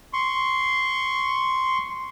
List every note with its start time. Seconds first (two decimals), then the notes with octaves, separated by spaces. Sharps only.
0.13 C6 C#6